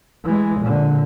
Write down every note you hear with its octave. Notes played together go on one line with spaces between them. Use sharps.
E3 G#3
A#2 D3